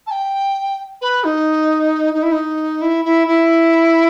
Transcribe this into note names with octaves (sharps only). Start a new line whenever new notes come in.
A5
G5
B4
D#4
D#4
E4
D#4
E4
E4
E4